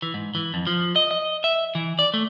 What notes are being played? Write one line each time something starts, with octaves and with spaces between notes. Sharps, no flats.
E3
G#2
E3
F2
F3
D#5
D#5
E5
E3
D5
A3